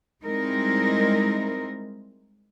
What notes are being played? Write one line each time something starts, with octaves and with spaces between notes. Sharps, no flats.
G3 G#3 C4 D#4 E4 A#4